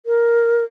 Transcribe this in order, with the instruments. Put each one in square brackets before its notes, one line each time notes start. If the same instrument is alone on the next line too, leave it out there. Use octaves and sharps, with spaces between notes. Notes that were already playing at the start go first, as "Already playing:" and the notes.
[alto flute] A#4